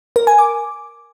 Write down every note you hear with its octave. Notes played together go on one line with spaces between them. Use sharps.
A#4
G#5
D6